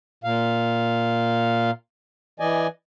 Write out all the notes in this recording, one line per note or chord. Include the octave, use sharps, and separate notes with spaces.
A#2 F5
E3 D5 D#5 G#5